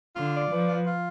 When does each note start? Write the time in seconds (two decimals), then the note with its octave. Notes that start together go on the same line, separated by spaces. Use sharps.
0.16 D3 F4
0.34 D5
0.51 F3 B4
0.68 F4
0.86 F4